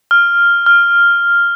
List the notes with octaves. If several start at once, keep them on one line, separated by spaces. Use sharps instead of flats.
F6
F6